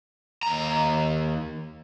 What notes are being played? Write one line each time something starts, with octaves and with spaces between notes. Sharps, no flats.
D#2 A#5